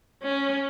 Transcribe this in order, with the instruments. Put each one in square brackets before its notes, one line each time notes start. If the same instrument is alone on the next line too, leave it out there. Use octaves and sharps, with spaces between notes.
[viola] C#4